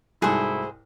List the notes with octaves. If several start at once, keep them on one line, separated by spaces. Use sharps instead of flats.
C2 G#2 A3 E4 F#4 G#4 C5 G#5